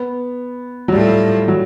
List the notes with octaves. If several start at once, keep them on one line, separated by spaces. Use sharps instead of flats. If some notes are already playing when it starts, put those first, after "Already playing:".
Already playing: B3
F#3
A2 F3 G3 A3
F#3